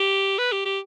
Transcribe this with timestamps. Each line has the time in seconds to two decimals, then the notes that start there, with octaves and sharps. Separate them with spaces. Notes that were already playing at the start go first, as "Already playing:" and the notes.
Already playing: G4
0.38 B4
0.52 G4
0.65 G4